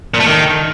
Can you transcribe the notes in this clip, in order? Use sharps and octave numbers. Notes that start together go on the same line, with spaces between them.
A#2
A3
D#3